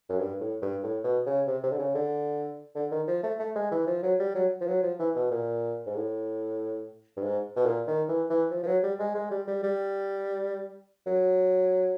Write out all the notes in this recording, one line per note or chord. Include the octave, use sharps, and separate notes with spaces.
F#2
G2
A2
G2
A2
B2
C#3
C3
C3
D3
C#3
D3
D3
D#3
F3
A3
A3
G#3
E3
F3
F#3
G3
F#3
F3
F#3
F3
E3
B2
A#2
G#2
A2
G2
G#2
B2
A#2
D#3
E3
E3
F3
F3
F#3
G3
G#3
G#3
G3
G3
G3
F#3